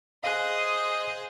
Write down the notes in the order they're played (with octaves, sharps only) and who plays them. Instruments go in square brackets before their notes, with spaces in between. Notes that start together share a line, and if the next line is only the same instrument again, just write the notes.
[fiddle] G#4 C5 [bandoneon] D#5 D#6 [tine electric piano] F5 F#6